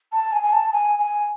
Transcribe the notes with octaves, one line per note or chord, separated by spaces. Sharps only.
A5
G#5
G#5
A5
G#5
G#5